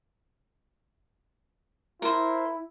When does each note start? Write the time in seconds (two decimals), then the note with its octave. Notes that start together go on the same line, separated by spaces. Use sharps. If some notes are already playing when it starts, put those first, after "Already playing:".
2.02 E4 A#4 C5